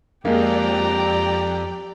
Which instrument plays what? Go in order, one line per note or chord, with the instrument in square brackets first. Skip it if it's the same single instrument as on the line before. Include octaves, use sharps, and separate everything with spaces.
[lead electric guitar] F2 [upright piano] G#3 A#3 [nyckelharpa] G4 A#5 [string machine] D5 G5